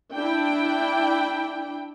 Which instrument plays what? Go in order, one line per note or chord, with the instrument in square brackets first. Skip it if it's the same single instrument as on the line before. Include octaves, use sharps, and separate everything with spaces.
[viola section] D4 E4 G5